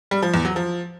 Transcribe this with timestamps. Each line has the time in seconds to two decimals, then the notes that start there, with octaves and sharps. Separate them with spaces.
0.11 G3
0.22 F3
0.34 E2
0.45 F#3
0.56 F3